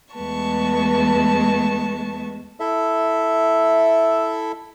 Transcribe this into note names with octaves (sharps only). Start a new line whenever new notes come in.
E2 G#3 A3 B4 A5 C#6
E4 A4 E5